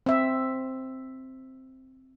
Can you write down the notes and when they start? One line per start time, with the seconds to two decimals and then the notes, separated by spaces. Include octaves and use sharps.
0.06 C4 E5